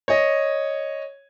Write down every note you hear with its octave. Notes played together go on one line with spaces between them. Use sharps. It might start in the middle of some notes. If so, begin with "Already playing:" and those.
C#5 D#5